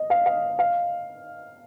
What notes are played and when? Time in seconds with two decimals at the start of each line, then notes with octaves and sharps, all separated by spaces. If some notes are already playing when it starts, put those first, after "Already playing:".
Already playing: D#5
0.10 F5
0.26 F5
0.59 F5